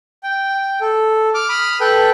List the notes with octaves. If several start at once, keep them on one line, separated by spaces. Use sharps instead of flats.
G5
A4
D6 F6
B5 D#6 F6
A4 B4 G5 F#6